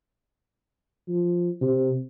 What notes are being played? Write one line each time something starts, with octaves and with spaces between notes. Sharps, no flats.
F3
C3